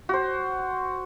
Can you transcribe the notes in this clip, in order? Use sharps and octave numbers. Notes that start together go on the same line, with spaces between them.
F#4 C5